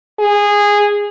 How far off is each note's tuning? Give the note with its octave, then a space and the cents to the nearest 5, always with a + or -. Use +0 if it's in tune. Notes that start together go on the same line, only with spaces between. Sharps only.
G#4 -15